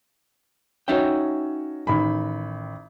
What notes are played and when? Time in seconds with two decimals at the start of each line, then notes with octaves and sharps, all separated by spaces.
0.88 C#4 D#4 F#4 C#5 E5 G5
1.87 A1 D#3 B5